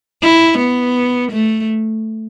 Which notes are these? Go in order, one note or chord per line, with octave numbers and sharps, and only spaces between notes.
E4
B3
A3